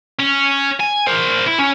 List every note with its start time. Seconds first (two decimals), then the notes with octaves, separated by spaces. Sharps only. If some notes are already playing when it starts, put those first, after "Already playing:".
0.20 C#4
0.80 G#5
1.07 A#4 C5
1.47 E4
1.59 C#4